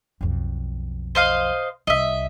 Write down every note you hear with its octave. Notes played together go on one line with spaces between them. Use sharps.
B1 F2
C5 D#5 F5
C2 D#5 E5